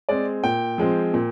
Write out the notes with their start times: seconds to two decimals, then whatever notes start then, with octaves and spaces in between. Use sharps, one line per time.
0.09 G#3 C4 D5
0.44 A#2 G5
0.78 F3 G#3 C4
1.14 A#2